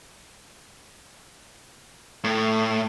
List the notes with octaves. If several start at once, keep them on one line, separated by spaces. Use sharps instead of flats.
A2